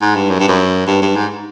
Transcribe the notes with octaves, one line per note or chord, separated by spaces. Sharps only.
G#2
G2
F#2
G2
F#2
G2
G2
G#2